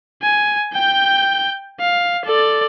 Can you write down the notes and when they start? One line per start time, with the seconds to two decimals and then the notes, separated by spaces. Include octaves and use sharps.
0.22 G#5
0.73 G5 G6
1.80 F5
2.25 A4 D5